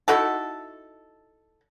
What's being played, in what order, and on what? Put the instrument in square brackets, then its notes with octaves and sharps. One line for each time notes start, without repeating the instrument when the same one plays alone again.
[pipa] D#4 E4 F#4 A4